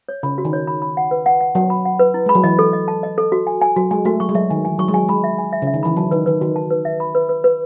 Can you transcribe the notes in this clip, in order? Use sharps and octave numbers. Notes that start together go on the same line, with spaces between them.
C#5
C#3 B5
F#4
D#3
C#5
B5
B5
F#5
B4
F#5
F#5
F#3 F#5
B5
F#5
B4
E4
G#3 B5
F#3
E3 D#5
A4
D#5
A5
D#5
A4
F#4
G#5
G#5
F#3 F#4
G#3 G#5
A3 F#4
F#3 C#6
G#3
F#3 E5
D#3 G#5
E3 G#5
F#3 C#6
G#3
F#3 G#5
G#3 B5
E5
G#5
E5
C#3
E5
D#3
E3 B5
F#3 A5
D#3 B4
D#3 B4
D#3 F#4
A5
B4
E5
B5
B4
B4
B4